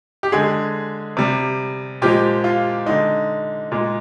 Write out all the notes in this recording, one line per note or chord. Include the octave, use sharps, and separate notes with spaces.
G4
D3 G#3 G#4
C3 G3
A#2 F3 G#3 G4
F4
D3 G#3 D#4
A#2 G#3